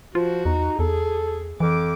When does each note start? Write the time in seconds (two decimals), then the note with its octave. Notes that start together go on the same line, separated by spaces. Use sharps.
0.15 F3 F4 F#4
0.45 E2 D#4
0.79 E2 G#4 A4
1.60 F2 E3 D6